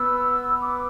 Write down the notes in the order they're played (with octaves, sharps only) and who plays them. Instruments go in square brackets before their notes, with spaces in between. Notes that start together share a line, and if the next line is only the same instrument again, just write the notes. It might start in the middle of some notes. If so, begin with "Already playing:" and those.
Already playing: [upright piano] B3 [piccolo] E6
[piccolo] D6